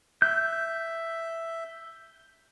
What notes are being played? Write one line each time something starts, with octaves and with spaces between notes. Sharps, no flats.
E5 G6